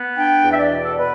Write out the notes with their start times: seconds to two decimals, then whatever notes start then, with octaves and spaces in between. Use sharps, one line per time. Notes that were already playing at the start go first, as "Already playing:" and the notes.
Already playing: B3
0.17 D4 G5
0.44 E2
0.52 E5
0.57 D5
0.71 B2
0.85 A4
0.97 B2 B4